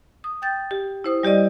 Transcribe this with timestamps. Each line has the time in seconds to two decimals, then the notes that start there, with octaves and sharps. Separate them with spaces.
0.24 D#6
0.42 G5 G6 A6
0.71 G4
1.04 E4 C5 D#6
1.23 G3 G4 D5 D#5